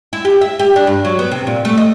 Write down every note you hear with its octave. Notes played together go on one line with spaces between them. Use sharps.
E4
G4
E5
G4
D4
G2
F#3
B3
C3
A#2
A3
D#5